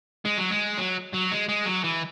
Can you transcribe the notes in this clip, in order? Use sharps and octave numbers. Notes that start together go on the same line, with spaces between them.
G#3
F#3
G#3
F#3
F#3
G#3
G#3
F#3
E3